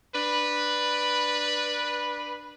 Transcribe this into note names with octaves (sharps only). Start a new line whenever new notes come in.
D4 B4